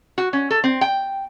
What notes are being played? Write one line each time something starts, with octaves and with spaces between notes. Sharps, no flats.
F#4
C#4
A4
C4
G5